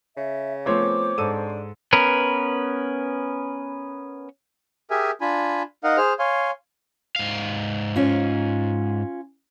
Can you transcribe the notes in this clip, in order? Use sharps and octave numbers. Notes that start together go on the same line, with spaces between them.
C#3 E5
F3 A3 B3 C4 C5 C#5 D6
G#2 D4 A4 D#7
B3 C#4 A#4 B4
G4 G#4 A#4 E5 G#5
D4 F4 G#5 B5
D#4 A#4 D#5 F5 F#5
G#4 C5 F6
C#5 F5 G#5 C6
G#2 F5
C#4 F4